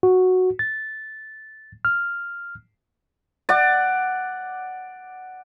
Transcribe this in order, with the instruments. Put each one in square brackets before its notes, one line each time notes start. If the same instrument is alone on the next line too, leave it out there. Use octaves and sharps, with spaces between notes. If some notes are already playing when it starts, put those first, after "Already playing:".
[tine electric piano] F#4
A6
F6
[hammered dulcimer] D5 F#5